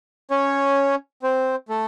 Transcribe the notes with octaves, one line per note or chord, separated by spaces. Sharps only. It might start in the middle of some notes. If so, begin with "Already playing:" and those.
C#4 C#5
C4 C5
A3 A4